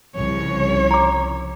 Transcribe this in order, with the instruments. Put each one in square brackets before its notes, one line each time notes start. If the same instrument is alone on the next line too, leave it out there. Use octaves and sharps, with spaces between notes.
[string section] C2 C#3 F3 [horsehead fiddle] C#5
[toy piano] A#5 D6